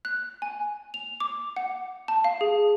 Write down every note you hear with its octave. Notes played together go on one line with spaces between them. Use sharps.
F#6
G#5
F7
D6
F#5
A5
F5
G#4